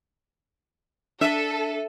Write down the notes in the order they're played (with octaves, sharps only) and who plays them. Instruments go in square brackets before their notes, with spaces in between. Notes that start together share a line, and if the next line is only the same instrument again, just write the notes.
[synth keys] D4 D#7 [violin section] A4 [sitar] E5